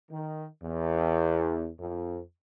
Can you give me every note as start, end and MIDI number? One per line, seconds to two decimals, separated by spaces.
0.11 0.46 51
0.62 1.70 40
1.79 2.21 41